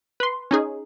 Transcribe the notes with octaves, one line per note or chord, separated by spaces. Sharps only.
B4 C6
C#4 D#4 G#4